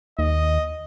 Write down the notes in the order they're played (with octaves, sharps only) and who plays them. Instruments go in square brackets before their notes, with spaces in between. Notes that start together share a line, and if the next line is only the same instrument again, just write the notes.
[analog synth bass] D#2 [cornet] D#5